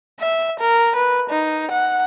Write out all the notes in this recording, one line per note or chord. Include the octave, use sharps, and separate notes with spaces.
E5
A#4
B4
D#4
F#5